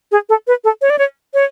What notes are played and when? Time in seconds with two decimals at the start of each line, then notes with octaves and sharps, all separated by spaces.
0.12 G#4
0.29 A4
0.47 B4
0.64 A4
0.81 C#5
0.90 D5
0.99 C#5
1.34 C#5